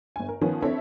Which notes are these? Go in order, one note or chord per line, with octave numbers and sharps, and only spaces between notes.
G1 G#5
A#4
D#3 F3 B3 C#4
C4 D4 E4 A4 C#5 E5